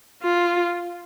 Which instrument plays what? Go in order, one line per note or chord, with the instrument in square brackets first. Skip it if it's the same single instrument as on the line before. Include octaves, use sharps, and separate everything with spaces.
[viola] F4